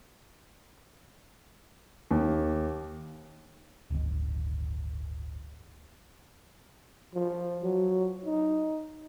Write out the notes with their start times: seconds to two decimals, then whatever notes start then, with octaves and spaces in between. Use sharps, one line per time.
2.11 D#2
3.90 D1 G1 D2 D#3
7.15 F3
7.63 F#3
8.26 D#4